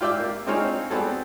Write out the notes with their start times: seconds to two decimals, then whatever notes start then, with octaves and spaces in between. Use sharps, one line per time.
0.01 F4 G4 D5 E5 G5
0.20 A#3
0.47 C4 D4 D#4 F4 G#4 C#5
0.91 G3 B3 C4 G#4 A4